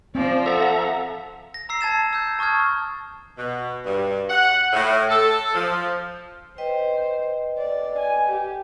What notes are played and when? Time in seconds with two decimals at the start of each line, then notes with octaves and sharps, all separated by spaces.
0.15 F3 C4 C5 D5
0.46 A4 E5 F#5 A#5
1.54 A#6
1.69 A#5 E6 C7
1.81 A5 G#6 A6 E7
2.13 E6 G6
2.39 A5 C#6 D#6 F6 G#6
3.37 B2
3.86 G2
4.30 F#5
4.73 A2
5.09 A4
5.55 F3
6.58 B4 C5 D#5 G5
7.58 D5
7.99 G#5
8.29 G4